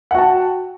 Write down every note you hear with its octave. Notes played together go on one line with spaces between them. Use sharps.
F#4 F#5 G5 A5